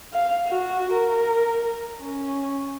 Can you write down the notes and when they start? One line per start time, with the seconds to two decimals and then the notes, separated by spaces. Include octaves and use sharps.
0.14 F5
0.48 F#4
0.93 A#4
2.02 C#4